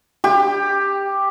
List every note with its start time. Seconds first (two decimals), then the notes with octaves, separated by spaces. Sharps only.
0.24 G4